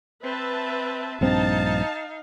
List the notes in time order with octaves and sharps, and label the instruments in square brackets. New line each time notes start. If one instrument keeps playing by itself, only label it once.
[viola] C4 [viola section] B4 E5 A5
[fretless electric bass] A#1 G2 C4 [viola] D#4 F5 [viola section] A5